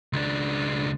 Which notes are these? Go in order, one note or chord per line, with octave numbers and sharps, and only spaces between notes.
C#2 D4